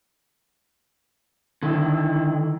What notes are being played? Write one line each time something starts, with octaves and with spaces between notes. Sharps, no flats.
D3 D#3 E4